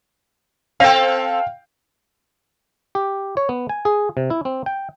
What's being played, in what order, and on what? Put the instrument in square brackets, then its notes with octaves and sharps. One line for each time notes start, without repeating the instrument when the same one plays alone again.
[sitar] C4 A4 [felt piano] F5 G5
[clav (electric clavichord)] G4
C#5
B3
G#5
G#4
C3
E4
C4
G5